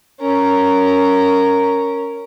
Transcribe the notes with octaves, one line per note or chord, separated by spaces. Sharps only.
C#4 A#4